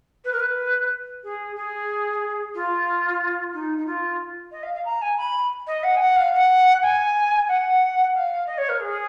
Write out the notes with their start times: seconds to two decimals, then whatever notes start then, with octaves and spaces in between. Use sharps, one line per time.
0.24 B4
0.32 A#4
0.40 B4
1.23 G#4
1.56 G#4
2.55 F4
3.54 D#4
3.78 D#4
3.86 F4
4.52 D#5
4.63 F5
4.74 F5
4.85 A#5
5.02 G#5
5.18 B5
5.67 D#5
5.83 F#5
5.96 G#5
5.99 F#5
6.16 F5
6.33 F#5
6.82 G#5
7.48 F#5
8.14 F5
8.47 D#5
8.58 C#5
8.69 A#4
8.80 G#4